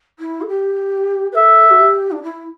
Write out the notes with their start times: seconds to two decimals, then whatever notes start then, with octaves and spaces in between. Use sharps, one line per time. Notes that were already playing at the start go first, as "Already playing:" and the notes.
0.19 E4
0.41 A4
0.48 G4
1.32 B4
1.35 A4 E5
1.70 F#4
1.79 G4
2.11 D4
2.23 E4